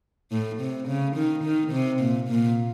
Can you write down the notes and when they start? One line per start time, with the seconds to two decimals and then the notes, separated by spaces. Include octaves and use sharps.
0.32 A2
0.60 C3
0.88 C#3
1.16 D#3
1.44 D#3
1.72 C3
2.00 A#2
2.29 A#2